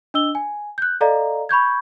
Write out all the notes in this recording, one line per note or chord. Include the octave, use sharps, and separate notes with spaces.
D4 D#5 E6 G7
G#5
F#6 G6
A4 D5 D#5 F5 A#5
B5 C#6 G6 G#6